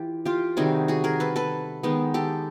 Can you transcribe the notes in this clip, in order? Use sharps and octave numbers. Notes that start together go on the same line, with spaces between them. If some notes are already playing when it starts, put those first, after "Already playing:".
Already playing: E3 F4 G4
F4 G4
C3 D#3 G3 F#4 G#4
F#4 G#4
G#4 A#4
A4 B4
A4 B4
D#3 G#3 B3
G4 A4